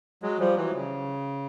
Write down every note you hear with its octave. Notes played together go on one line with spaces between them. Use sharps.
F#3 G#3
F3 G3
E3 F#3
C#3